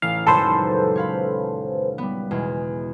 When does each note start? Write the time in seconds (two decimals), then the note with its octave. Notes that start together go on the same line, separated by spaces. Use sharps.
0.02 A1 F5
0.27 D#1 C#2 F#2 A4 B4 C5
0.96 C#5 F5 B5
1.98 G3 B3
2.31 E2 B2 G#3